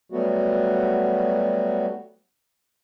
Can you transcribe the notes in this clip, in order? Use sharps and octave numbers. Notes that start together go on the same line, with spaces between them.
F#3 G3 A3 B3 F#4